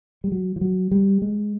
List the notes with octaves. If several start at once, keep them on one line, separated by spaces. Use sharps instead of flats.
G3
F#3
F3
F#3
G3
G#3